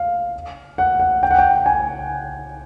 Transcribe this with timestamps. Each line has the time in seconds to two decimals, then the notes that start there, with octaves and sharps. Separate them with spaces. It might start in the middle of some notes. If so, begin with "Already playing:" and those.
Already playing: F5
0.78 F#5
1.00 F#5
1.23 G5
1.31 F#5
1.39 G5
1.66 G#5